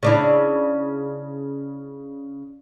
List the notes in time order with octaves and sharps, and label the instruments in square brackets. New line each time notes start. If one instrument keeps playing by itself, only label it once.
[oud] C#3 D4 E4